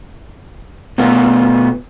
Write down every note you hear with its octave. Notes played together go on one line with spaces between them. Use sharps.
B2 A3 B3 F4